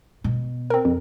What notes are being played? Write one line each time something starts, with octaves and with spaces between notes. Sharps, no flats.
B2
C4 A#4
F2